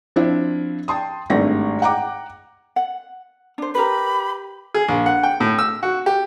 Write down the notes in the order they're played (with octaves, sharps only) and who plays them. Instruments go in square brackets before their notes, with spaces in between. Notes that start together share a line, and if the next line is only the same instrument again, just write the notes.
[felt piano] F3 C4 D4 E4
G5 A5 C6 D#6
G#1 G2 A3 A#6
F#5 G5 A#5 D6
[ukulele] F#5
D4 C5
[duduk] G4 [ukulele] A#4 B4 [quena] B5
[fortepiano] G#4
A#1
F#5
G5
A2
E6
F#4
G4